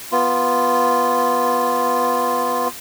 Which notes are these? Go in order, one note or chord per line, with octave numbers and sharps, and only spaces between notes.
B3 F4